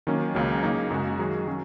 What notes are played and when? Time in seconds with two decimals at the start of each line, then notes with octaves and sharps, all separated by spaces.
0.07 D#3 F#3 A#3 C#4
0.35 C#2 C#3 F#3 A#3
0.63 C#3 A#3 D#4
0.90 F#2 C#3 G#3 F#4
1.19 D#3 F#3 D#4 G#4
1.47 F#3 C#4